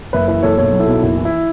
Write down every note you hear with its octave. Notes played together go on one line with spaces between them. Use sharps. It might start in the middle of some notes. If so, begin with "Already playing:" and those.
F#1 B4 E5
E3 B4 E5
F#1 A4 C#5
B1 A4 C#5
F#3
E4 A4
B1
F#1 E4
E3
E4